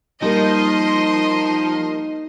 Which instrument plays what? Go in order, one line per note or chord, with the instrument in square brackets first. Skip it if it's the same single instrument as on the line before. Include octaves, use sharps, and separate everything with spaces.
[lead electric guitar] F3 [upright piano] G3 A#3 A#4 [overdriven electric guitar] D#4 [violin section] D#5 C6